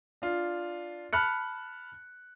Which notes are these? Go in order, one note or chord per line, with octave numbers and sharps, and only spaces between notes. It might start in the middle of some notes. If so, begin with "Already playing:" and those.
D4 F4
A5 B5 F6 F#6 C#7